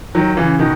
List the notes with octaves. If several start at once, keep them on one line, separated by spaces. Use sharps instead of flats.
D#3 F#3
C#3 E3
B2 D#3